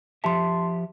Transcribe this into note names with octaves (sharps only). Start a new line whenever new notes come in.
F3 G4 E5 A5 C6